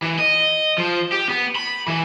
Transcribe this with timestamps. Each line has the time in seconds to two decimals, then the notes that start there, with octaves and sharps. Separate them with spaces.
0.02 E3
0.19 D#5
0.78 F3
1.12 G4
1.29 B3
1.56 B5
1.88 E3